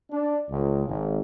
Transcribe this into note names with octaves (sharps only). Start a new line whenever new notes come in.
D4
C#2
G#1